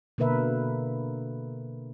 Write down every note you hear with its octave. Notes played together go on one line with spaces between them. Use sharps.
B2 D3 A#3 A#4 B4 E5